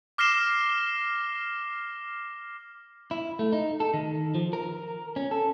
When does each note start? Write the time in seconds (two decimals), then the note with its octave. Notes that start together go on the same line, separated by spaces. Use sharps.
0.18 D6 F6 A#6 C7 E7 G7
3.11 E4
3.39 A3
3.53 D#4
3.80 A4
3.94 D#3
4.35 F3
4.53 A#4
5.16 C#4
5.31 A4